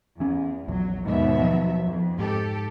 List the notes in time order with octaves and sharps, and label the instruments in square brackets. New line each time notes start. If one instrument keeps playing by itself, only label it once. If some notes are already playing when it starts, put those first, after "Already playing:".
[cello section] E2 [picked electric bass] E3 C#4
[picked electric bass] A#1 E2 [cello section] F#3
[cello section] D#2 B2 E5 [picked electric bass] G#2
[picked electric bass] F3 F#3
[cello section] F2
[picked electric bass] G#2 [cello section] G4 A4